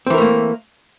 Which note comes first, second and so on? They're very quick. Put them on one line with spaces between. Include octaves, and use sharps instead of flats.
C4 E3 A#4 A3 A#3